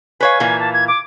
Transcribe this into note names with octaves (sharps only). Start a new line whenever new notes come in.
B4 C#5 F5 G#5
A#2 E3 A#3
A5
G#6
D6